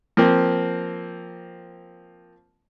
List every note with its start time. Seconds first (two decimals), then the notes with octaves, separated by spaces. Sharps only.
0.17 F3 A#3 C4